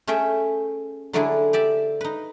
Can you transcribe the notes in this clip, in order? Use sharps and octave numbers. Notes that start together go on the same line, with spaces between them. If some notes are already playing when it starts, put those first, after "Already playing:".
A3 C#4 G#4 E5 G5
D3 F#3 A3 D4 E4 G#4
G4 D5 E5
D#4 B4